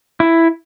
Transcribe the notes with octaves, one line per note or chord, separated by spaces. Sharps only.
E4